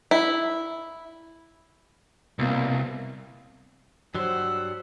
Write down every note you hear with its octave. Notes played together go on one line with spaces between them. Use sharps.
E4
C2 B2 A#3 C4
G2 F#3 G3 C5 F#5 E6